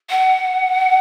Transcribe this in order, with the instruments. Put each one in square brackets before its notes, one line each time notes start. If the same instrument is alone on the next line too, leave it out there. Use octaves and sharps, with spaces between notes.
[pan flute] F#5